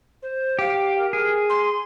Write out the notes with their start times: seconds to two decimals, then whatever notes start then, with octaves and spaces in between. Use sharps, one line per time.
0.22 C5
0.59 G4 F5
0.98 A#4
1.13 G#4
1.49 C6